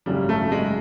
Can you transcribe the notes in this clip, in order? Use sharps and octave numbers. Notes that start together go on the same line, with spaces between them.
G#1 F#2 C#3 F#3 G3
A3
G#3